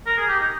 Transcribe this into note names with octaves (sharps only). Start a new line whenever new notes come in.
A#4
G#4
G4
D#4